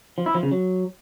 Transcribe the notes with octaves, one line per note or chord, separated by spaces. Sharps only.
F3
E4
F3
C#3
F#3